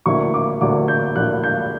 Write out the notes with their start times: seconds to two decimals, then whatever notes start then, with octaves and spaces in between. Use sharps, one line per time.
0.06 D2 D3 A#3 E4 C#6
0.34 D6
0.61 D2 D3 A#3 E4 D6
0.88 G6
1.16 D2 D3 A#3 E4 F#6
1.43 G6